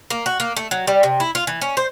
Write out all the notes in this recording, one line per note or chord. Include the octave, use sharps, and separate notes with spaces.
A#3
F#4
A#3
A3
F#3
G3
C3
E4
F4
E3
C#4
C5